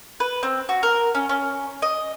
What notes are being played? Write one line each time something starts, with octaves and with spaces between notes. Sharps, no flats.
B4
C4
F#4
A#4
C#4
C#4
D#5